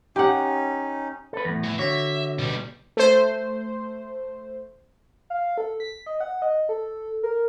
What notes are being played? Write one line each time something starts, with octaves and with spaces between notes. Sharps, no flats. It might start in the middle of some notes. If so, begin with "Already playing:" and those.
C#4 D#4 G4 F#5
A4 B4
E2 A2
E3
D3 F#4 C#5 E5
B2 G3
A3 C5
F5
A4
B6
D#5
F#5
D#5
A4
A#4